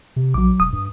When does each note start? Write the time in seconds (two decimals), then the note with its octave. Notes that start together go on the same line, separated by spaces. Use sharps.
0.16 C3
0.34 A#1 F#3 D6
0.60 E1 D#6
0.72 G2